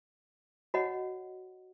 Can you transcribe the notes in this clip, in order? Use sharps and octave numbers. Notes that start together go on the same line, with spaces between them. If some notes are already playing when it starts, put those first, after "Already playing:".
F#4 C#5 D#5 F#5